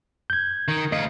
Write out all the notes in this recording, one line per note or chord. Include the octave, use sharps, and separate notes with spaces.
G6 G#6
D#3
D2 F4 D#5